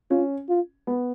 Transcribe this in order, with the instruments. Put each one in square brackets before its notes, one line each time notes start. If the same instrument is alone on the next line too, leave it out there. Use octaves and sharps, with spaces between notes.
[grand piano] C#4 [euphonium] F4
[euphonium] F4
[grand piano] B3